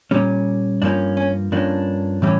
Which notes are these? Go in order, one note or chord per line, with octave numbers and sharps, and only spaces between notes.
A#2 G3 C#4
G2 F3 A#3 C#4 D4
C#4
G2 F3 A#3 C#4 D4
A2 E3 G3 C#4